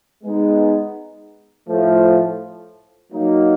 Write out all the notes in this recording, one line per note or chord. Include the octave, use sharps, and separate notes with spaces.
G#3 B3 D#4
A2 F3 A3
F#3 A#3 D#4